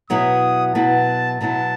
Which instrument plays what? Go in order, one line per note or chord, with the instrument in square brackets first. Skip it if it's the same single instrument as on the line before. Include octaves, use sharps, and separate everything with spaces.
[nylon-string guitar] B2 F#3 B3 E4 [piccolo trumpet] D#6
[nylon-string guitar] B2 F#3 B3 E4 [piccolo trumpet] A5
[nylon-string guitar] B2 F#3 B3 E4 [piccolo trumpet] A5